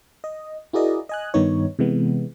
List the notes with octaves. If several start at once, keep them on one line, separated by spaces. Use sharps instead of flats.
D#5
E4 F#4 G#4 A#4 D5 D#5
D#5 G#5 F#6
G2 D#3 B3 D#4 C#5
C3 E3 G#3 B3